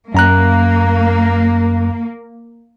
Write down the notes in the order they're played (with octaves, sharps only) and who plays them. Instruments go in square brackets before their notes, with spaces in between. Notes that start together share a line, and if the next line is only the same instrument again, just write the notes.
[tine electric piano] F#2 A#5 F#6 [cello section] A#3